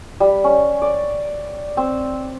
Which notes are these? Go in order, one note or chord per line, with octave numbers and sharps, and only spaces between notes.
G3
C#4
D5
C4